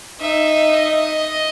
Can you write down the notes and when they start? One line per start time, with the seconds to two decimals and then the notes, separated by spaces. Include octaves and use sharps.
0.19 D#4 E5
0.73 D#5